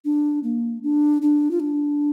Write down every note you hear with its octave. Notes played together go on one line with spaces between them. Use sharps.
D4
A#3
D4
D4
F4
D4